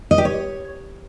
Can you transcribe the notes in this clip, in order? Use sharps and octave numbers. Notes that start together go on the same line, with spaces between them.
D#5
G4
C#5